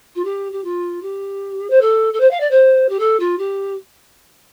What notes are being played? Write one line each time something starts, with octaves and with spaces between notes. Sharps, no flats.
F4
G4
G4
F4
G4
C5
A4
A4
C5
F5
D5
C5
G4
A4
F4
G4